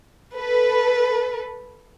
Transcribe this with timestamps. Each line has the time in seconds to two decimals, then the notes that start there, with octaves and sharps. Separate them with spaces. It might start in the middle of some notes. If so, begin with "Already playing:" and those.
0.35 A4 B4